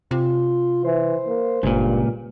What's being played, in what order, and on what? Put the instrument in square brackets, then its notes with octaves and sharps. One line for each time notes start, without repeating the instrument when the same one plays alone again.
[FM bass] C3 [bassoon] F4
[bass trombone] E3 [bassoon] C5
[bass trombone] A#3
[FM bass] G1 [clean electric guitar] C#2 A#2 [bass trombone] G2